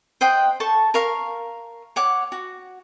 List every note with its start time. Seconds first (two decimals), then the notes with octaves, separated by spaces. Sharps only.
0.21 C5 D#5 F#5 G5
0.60 A4 A5 C#6
0.94 A#4 F5 C#6
1.96 C#5 F#5 D6
2.32 F#4